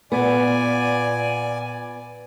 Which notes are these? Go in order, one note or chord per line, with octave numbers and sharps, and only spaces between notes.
A#2 B3 D5 G#5